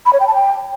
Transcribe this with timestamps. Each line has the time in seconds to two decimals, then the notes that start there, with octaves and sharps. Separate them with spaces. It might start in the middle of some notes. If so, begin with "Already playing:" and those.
0.06 B5
0.13 C#5
0.20 G5
0.27 A5
0.35 G5